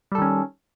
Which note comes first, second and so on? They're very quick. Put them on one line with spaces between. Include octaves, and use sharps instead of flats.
G3 A4 D#3 C#4